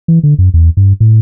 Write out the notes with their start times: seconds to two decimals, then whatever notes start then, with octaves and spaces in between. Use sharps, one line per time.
0.08 E3
0.23 D3
0.38 F#2
0.54 E2
0.77 G2
1.00 A2